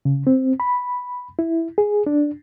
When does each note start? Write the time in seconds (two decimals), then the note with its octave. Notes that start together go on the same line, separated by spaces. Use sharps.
0.05 C#3
0.27 C4
0.60 B5
1.39 E4
1.78 G#4
2.06 D4